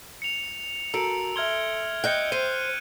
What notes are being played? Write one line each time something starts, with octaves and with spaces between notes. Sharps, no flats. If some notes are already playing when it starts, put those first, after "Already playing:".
C#7 F7
F#4 A4 A#4 A#5 E6 C#7 D7
E5 C6 F6 G#6 G7
D#5 G5 F#6 G6 C#7
C5 D#7